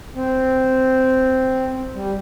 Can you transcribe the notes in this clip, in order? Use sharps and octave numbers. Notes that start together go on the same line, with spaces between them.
C4
G3